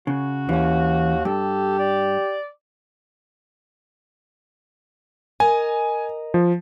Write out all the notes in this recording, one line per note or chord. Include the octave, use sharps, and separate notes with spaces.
C#3 F#4
D#2 E3 C#4
G2 G4 A4
D5
A#4 D#5 G#5
F3